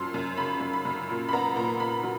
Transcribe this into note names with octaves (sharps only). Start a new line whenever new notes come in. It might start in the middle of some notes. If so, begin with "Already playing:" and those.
Already playing: F#2 F3 C6
F#2
C#3 B5
F#2
B5
F#2
A#2
B5
B3 A#5
A#2 A#5
A#2 B5
F#3